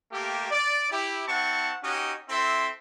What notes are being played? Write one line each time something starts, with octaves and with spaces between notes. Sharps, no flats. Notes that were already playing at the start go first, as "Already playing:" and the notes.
A3 A#3 G4
D5
E4 G4
C4 E4 F#5 A5 C#6
C#4 D#4 F#4 G4 D#5
C4 E4 A4 E5 C6